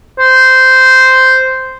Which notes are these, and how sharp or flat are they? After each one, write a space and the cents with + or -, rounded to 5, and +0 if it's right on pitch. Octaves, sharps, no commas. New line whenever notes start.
C5 -10